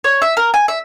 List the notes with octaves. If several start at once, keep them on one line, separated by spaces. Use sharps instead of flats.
C#5
E5
A#4
G#5
E5